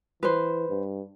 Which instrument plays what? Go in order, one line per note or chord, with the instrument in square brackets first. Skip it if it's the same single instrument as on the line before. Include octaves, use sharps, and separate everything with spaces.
[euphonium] E3 [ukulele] B4 C5
[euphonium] G2